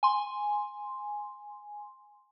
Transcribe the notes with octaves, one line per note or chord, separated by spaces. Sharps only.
G#5 C6